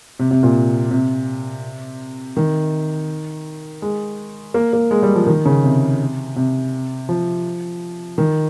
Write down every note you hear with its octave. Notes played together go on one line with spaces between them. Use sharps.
C3
C3
A#2
C3
D#3
G#3
A#3
A#3
G#3
G3
F3
D#3
C#3
C3
C3
F3
D#3